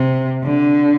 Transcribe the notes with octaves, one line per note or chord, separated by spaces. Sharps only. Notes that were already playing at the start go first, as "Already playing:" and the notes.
Already playing: C3
D3